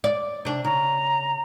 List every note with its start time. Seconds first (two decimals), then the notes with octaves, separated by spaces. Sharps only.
0.04 D5
0.45 C3 D4
0.65 C#3 A#5